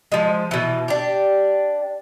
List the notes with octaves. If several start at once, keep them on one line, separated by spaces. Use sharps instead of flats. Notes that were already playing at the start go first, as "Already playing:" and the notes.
F3 G#3
B2 E3
D4 G4